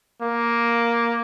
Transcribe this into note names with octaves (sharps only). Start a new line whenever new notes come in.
A#3